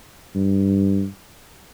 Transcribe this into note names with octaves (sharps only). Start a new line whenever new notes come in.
G2